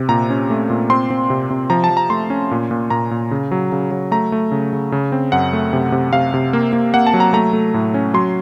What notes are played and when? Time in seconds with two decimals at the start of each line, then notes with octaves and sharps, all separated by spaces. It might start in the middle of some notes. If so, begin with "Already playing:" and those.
Already playing: C3
0.09 A#2 A#5
0.30 C#4
0.50 A3
0.70 A#2
0.90 C4 C6
1.10 C4
1.30 C3
1.50 C3
1.70 F3 A#5
1.84 A5
1.90 F3
1.97 A#5
2.10 A3 C6
2.30 C#4
2.51 A#2
2.71 A#2
2.90 A#2 A#5
3.11 A#2
3.31 C#3
3.51 F#3
3.72 C#3
3.91 F#3
4.11 A3 A#5
4.32 A3
4.52 C#3
4.73 C#3
4.92 C#3
5.12 C4
5.32 F#2 F#5
5.53 A3
5.73 C3
5.92 C3
6.12 C3 F5
6.34 C3
6.53 A#3
6.73 A#3
6.94 A#3 F#5
7.07 A5
7.14 F#3
7.20 A#5
7.33 A3 A#5
7.53 A3
7.74 A2
7.94 C#4
8.14 F#3 C6